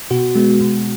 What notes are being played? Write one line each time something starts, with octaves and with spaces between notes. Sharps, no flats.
B2 F#4
G#3 B3
B2